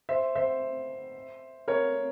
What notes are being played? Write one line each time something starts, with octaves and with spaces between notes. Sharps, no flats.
C5 E5
C5 E5
A#4 C#5